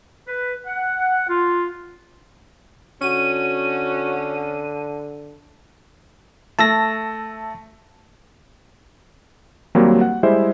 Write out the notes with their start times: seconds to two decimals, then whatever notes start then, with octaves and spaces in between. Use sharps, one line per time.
0.27 B4
0.65 F#5
1.28 F4
3.02 D3 C#4 F#4 D#7
6.59 A3 A5 E6 A#6
9.75 D#2 F#3 G3 A#3 C4
10.01 F#5
10.23 G3 G#3 E4 C5 D#5 E5